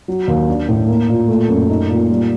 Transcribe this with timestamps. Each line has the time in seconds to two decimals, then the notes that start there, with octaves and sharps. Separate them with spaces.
0.08 F#3
0.28 D#2
0.48 D4
0.68 A2
0.88 A#3
1.09 A#2
1.28 A3
1.49 F#2
1.69 D#4
1.89 A#2
2.10 G3